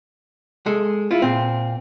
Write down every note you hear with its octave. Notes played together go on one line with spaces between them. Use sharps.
G#3 A4
E4 F4
A#2 C4